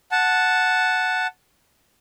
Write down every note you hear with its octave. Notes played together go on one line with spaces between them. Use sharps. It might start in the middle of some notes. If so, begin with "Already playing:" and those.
F#5 A5